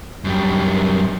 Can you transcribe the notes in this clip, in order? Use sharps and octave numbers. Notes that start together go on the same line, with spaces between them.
F#2 G3